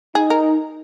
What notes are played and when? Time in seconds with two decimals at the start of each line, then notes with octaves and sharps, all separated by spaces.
0.15 D#4 G#4
0.30 A#4